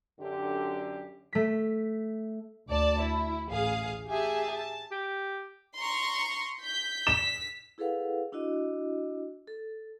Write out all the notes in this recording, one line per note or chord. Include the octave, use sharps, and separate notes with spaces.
F#2 D3 G4
A3 B6
D2 D5 A5
E4
A1 G#4 F5
G4 G#4 E5 G#5 A5
A5
G4
A#5 C6 C#6
G6 B6
B6 E7
E4 G#4 A4 B4 F5 F#5
D4 E4 F#4 D#5
A4